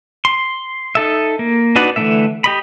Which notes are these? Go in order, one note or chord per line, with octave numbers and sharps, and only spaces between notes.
C6
D#4 A4 E5
A#3
D4 D#4 F#4 B4 D5
D3 E3 A3 A#3 E5
G4 D#5 B5